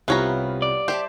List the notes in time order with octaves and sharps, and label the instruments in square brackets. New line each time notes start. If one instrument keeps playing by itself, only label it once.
[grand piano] C2 C3 F4 [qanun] G3 F5 [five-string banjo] B3 C#5 A#5
[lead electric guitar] D5
[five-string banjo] G4 [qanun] C5 E5 A5